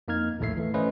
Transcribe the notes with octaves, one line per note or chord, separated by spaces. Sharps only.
F2 A#3 D#4 F6 G#6
A#1 D#2 A2 A3 E5 C7
E3 A3
A3 C#4 B4 C5 D#5 F5